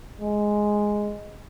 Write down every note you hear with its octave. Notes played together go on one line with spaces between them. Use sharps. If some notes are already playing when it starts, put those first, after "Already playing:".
G#3